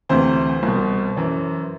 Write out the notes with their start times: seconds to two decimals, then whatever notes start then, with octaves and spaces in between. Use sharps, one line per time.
0.09 D2 C3 E3 C5
0.63 C2 B2
1.16 F#2 E3